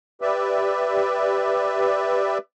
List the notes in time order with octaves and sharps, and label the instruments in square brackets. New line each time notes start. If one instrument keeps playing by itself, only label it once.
[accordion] G4 B4 D5 E5